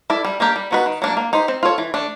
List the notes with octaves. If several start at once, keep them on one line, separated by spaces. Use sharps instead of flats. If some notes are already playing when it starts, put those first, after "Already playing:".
E4 A4 D5
G3
A#3 D4 G4 A#4
G3
B3 D#4 F#4 B4
D#3
F#3 A#3 D4
A#3
D#4 G4 C5
C4
F4 A4 C#5
E3
A3 D4